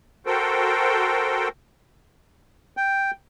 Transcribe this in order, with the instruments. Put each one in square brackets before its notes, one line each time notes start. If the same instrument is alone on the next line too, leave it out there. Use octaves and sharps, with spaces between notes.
[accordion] F#4 A4 A#4 C5 G5
[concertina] G5